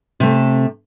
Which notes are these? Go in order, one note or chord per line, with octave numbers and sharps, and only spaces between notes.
C3 A3